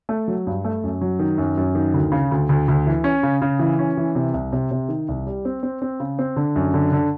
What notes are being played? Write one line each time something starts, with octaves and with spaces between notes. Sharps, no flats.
A3
F#3
G2
A3
F#2
F#3
D#3
F#2
F#2
D#3
D2
C#3
D2
D2
D2
E3
C#4
C#3
C#3
E3
C#4
E3
C3
C2
C3
C3
D#3
C2
G3
C4
C4
C4
C#3
C4
D3
F#2
D3
D3